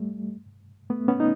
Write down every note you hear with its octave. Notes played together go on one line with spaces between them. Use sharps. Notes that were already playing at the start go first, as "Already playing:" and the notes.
Already playing: G3 A3
A3 B3
B3 C#4
D#4